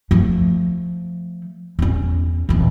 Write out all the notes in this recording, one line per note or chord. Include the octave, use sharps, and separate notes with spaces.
F3 A3
E2 C#4
D#1 E3